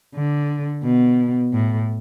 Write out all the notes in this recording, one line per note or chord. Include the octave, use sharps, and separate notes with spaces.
D3
B2
A2